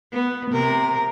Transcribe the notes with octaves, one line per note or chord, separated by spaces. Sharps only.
B3
C3 A#4